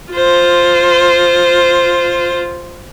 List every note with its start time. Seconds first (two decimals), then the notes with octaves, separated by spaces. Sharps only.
0.12 F4 C5